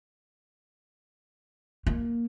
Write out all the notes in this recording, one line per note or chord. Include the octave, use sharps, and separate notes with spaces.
A#3